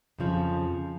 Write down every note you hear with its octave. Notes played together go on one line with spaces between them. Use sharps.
F2 C#3 F3